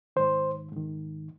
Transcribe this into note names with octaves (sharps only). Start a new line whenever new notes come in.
G#2 D#3 C5
G#2 D#3